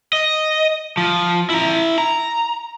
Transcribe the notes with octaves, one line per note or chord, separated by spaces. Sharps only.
D#5
F3
E4 A#5
A#5